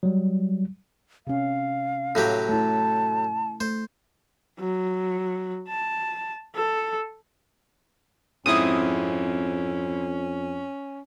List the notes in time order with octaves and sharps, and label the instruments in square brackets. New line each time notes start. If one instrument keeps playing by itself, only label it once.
[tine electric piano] F#3 G3
[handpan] C3 C#4 [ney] F5
[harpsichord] A2 F#3 G4
[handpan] A3 E4 [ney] A5
[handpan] A3 [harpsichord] C5
[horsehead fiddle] F#3
A5
A4
[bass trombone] F2 [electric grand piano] G#2 C4 E4 [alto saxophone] C#4 [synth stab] D#6